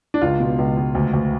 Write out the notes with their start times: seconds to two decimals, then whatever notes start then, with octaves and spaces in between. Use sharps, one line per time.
0.14 D4
0.21 C#2 F4
0.40 B2
0.58 C#2
0.77 C#2
0.95 D2
1.13 D2